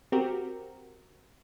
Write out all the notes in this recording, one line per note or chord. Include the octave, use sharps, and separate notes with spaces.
C4 F#4 G4 A#4